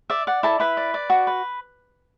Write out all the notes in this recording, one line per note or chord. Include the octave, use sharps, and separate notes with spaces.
D5 E5
D5 F#5
E4 A4 A5
E4 B4 B5
D5
D5
F#4
B4